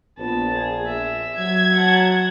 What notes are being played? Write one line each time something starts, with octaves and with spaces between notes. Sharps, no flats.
A#1 B3 A5
G#4
E5
F#3 G#6
F#5 A5